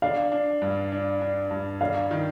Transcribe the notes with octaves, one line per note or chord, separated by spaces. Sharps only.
D4 F5
D4
G2
D4
D4
G2
D4 F5
D#3